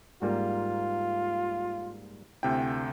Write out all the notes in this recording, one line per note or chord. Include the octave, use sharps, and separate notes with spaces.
G#2 G3 A#3 F4
D2 C3 E4 G5